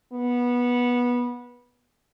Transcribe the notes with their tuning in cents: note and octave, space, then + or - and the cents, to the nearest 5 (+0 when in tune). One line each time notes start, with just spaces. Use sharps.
B3 -15